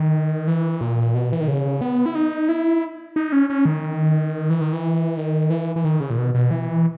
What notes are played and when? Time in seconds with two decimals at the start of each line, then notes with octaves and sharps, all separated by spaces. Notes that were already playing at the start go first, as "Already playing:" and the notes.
Already playing: D#3
0.47 E3
0.81 A#2
1.15 B2
1.33 E3
1.41 D#3
1.48 C#3
1.81 B3
2.06 E4
2.15 D#4
2.49 E4
3.16 D#4
3.32 C#4
3.50 C#4
3.65 D#3
4.50 E3
4.61 D#3
4.73 E3
5.17 D#3
5.50 E3
5.76 E3
5.84 D#3
6.00 C#3
6.10 A#2
6.18 B2
6.34 B2
6.51 E3